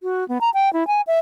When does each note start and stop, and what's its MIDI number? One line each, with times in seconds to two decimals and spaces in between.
0.03 0.27 66
0.28 0.41 59
0.41 0.50 82
0.54 0.71 79
0.73 0.86 64
0.87 1.01 80
1.07 1.19 76